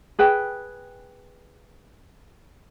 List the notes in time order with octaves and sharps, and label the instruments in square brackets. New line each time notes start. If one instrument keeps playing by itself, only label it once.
[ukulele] G#4 B4 G5